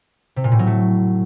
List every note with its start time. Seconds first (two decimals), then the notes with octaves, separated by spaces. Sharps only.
0.36 C3
0.44 A#2
0.52 A2
0.59 F#3
0.67 A3